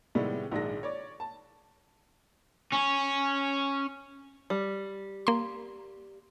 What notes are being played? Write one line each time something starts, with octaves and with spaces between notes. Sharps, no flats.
A2 C3 D#3 G3 G#3 B3
A#1 G#2 D#3 G#3 D4 A#6
C#5 D5
A5
C#4
G3
A#3 C6